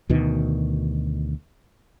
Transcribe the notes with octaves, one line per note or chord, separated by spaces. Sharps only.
D2 B2 D#3